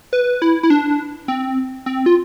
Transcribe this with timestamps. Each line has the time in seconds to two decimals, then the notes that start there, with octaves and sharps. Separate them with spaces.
0.13 B4
0.42 E4
0.63 E4
0.70 D4
1.28 C4
1.86 C4
2.06 F4